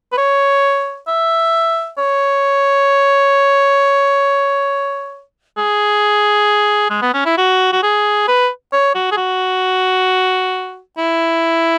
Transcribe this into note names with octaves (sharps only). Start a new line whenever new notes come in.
B4
C#5
E5
C#5
G#4
G#3
B3
C#4
E4
F#4
F#4
G#4
B4
C#5
F#4
G#4
F#4
E4